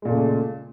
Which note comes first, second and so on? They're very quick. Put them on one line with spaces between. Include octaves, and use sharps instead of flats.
G#3 A#2 A3 C#3